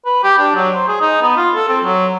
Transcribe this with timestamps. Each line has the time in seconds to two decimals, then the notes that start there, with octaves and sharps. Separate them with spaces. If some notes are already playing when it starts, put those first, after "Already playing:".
0.06 B4
0.24 G4
0.38 D4
0.55 F#3
0.74 C5
0.88 G#4
1.01 D#4
1.22 B3
1.37 F4
1.55 A4
1.68 C4
1.84 F#3